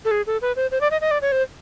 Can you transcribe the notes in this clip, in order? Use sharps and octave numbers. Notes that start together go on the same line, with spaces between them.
A4
G#4
A4
B4
C5
C5
D5
D#5
D#5
D5
C#5
C5